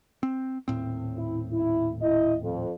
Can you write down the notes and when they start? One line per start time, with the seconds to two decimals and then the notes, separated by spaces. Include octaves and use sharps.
0.23 C4
0.68 D#1 A2 C4
1.16 E4
1.53 E4
2.02 E4 D#5
2.43 F2